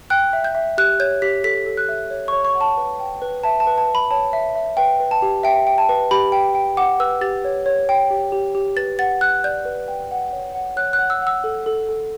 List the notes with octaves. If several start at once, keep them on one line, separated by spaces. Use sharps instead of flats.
G5 F#6
E5
G6
E5
G4 F#6
C#5 G6
G4 B6
A4 B6
A4
F#6
E5
C#5
C#5 C#6
C#6
F#5
A5
B4
G5
B4
E5 A5
A5
B4
A5
B4
B5
C#5 A5
E5
E5
B4 G5
B4
A5
G4
E5 G5
G5
A5
B4
G4 B5
G5
G5
F#5 D6
B4 E6
G4 A6
C#5
C#5
G5
G4
G4
G4
B4 A6
F#5 A6
F#5 F#6
D5 G6
B4
G5
F#5
C#5
F#5
C#5 F#6
F#6
F#5
E6
F#5 E6
A4
A4
A4